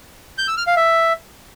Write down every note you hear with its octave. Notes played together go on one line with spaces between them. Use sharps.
G6
E6
F6
F5
E5